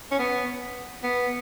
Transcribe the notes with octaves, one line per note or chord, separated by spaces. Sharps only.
C#4
B3
B3